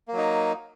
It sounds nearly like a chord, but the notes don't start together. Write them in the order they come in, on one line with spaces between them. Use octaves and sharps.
A#3 F#3 D#4